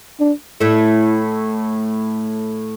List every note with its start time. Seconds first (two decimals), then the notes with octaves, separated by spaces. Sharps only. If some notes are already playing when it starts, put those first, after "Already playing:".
0.20 D4
0.60 A2 A3 E4